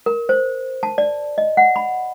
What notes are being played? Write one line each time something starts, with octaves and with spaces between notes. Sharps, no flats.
A#4
C5
A5
D5
D#5
F#5
B5